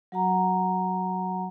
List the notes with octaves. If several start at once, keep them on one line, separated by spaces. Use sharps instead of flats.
F#3 F#4 F#5 A#5